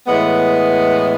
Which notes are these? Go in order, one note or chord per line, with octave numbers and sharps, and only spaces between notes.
A2 E3 G#3 B3